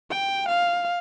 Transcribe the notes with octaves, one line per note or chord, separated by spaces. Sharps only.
G5
F5